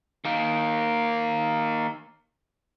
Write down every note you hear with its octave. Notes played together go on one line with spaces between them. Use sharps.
D#3 A#3